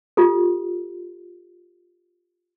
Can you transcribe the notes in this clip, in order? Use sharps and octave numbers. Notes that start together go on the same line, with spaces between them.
F4 G4 A4